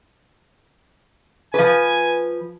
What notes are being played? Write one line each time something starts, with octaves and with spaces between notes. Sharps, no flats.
F3 B4 G#5